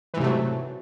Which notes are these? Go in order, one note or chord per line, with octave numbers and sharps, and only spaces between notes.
G#2 C3 E3 F#3 A3